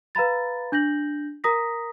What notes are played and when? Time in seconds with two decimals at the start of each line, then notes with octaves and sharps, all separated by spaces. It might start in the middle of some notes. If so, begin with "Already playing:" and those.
0.15 B4 F5 A#5 B5 A6
0.72 D4 G6 A#6 F#7
1.44 A#4 A#5 D#6 A#6 B6